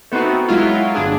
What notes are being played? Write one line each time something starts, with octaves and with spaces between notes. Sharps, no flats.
A3 B3 C4 D#4 F#4
F#3 G#3 E4 F4
G1 D4 G#4